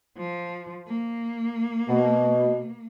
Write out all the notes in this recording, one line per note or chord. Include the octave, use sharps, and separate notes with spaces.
F3
A#3
B2